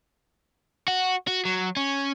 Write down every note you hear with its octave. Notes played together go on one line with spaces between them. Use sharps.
F#4
F#4
F#3
C#4